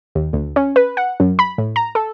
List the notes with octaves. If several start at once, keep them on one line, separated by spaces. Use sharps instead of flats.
D#2
D2
C#4
B4
F#5
F#2
B5
A2
A#5
A4